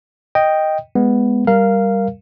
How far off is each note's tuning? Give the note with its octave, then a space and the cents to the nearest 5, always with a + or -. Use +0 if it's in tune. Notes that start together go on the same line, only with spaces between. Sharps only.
D#5 +0 G5 +0
G#3 +0 B3 +0
G3 +0 A#4 +0 F5 -10